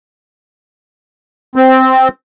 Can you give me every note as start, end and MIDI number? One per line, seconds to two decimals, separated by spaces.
1.56 2.08 60